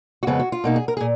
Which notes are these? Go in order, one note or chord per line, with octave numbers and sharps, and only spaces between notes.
F#4
F2 C#3 G#3 B3 G#4
F#4
F4
B2 A#3 D#4
G#4
A#4
G#4
A#2